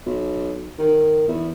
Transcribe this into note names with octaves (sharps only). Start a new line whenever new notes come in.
B1
D#3
E2